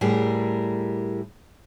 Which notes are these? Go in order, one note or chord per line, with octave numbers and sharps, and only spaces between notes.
A2 G3 G#4 A#4